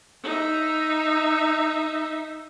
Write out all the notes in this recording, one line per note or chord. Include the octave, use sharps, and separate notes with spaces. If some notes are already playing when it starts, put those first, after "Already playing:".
D#4 E5